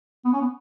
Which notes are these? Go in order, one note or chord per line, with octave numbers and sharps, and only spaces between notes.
B3
C#4
B3